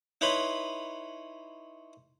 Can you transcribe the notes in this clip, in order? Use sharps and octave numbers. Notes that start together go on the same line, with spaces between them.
D#4 E4 B4 C#5 B5 C6